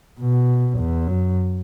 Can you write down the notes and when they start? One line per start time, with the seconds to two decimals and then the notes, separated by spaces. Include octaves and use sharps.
0.20 B2
0.78 E2
1.07 F#2